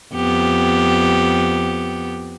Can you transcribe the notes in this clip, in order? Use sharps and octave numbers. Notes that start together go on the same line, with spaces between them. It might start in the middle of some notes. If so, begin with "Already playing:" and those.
F2 B3 G4